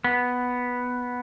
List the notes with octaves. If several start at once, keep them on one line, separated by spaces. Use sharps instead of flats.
B3